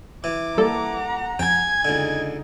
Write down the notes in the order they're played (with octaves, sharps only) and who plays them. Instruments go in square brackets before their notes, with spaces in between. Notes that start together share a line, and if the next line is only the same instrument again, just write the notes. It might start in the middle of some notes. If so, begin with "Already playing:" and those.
[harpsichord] E3 [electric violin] D6
[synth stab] G3 A#3 A4 [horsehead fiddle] F#5 A#5
[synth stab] F2 [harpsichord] G5 [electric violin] G#5 G#6
[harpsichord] C#2 D3 [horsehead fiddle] D#4